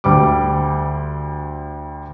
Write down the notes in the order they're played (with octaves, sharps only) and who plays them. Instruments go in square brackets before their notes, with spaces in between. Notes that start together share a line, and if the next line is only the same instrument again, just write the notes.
[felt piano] D2 G3 D6